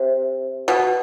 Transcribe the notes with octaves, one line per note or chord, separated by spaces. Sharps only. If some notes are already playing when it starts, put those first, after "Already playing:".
Already playing: C3
B2